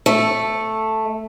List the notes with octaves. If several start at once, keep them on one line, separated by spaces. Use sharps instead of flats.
A3